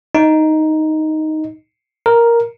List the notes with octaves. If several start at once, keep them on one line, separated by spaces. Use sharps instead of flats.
D#4
A#4